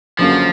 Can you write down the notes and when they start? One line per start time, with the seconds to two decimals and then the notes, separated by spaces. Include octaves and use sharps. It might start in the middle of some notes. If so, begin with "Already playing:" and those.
0.18 F#1 F#2 D3 F3 F#3 A#3